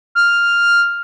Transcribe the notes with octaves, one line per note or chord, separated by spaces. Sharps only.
F6